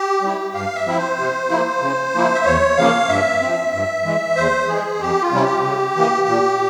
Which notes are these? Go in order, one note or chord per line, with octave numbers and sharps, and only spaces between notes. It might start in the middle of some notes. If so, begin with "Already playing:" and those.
Already playing: G4
G3 C4 E4
G2 F5
E5
F3 C4 E4
C5
C3
F3 A#3 E4
C#3
F3 A#3 E4
E5
E2 C#5
C#3 F3 A#3 F5
G2 E5
F3 C4
G2
E3 G#3
E2 C5
E3 G#3 G#4
F2 G4
F4
C3 G3 C#4 E4
G4
C#3
E3 A#3
A#2